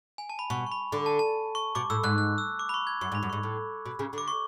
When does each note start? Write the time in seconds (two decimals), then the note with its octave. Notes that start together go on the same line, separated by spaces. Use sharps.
0.18 G#5
0.29 A5
0.39 B5
0.50 B2 C#6
0.67 C#6
0.72 B5
0.92 D3
1.06 A5
1.19 A5
1.55 C#6
1.75 B2 D6
1.90 A2 E6
2.03 G#2 F#6
2.18 F#6
2.38 E6
2.59 D6
2.69 B5
2.74 C#6
2.87 G#6
3.01 F#2 C#6
3.12 G#2
3.15 B5
3.23 F#2
3.30 G#2 C#6
3.43 A2
3.85 B2
3.99 C#3
4.13 D3 D6
4.28 C#6